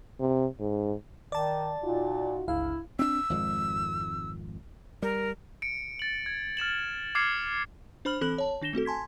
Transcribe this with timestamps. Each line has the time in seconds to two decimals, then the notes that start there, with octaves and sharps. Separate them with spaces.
0.20 C3
0.60 G#2
1.32 D#3 D5 A5
1.84 A#2 D#4 F4 F#4
2.48 G1 C#2 E4 F5
2.99 C4 D4 E6
3.30 G#1 F2 G#3
5.02 G3 A#4
5.62 C#7 D7
5.99 A6 F#7
6.26 G#6
6.57 F6 A6 E7 F#7
7.15 D6 F6 G#6 C7 C#7 E7
8.05 D4 C5 B5 F6 F#7
8.21 E3 C4 A4 B5 F#6 F#7
8.38 C#5 A5
8.62 D#3 D4 A#6 E7 G7
8.73 A3 C4 F#4 A4
8.85 G#5 A5 C6 G#6 B6